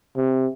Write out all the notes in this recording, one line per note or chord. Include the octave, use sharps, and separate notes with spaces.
C3